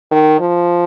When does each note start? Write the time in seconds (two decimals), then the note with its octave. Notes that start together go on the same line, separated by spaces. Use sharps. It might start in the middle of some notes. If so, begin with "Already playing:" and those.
0.11 D#3
0.40 F3